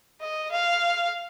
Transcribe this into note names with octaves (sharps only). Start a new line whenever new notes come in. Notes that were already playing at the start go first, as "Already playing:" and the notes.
D#5
F5